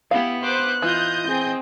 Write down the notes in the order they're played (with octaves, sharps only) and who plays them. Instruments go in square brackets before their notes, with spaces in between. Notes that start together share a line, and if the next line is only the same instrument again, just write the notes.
[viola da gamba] B3 [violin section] E4 [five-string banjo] G4 F5
[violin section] B4 C5 D6 [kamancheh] F#6
[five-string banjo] E3 [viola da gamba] F4 [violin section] D#5 D#6 G6
[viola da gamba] C4 [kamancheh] G#4 G5